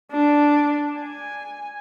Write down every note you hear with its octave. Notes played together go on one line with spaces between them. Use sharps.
D4
G#5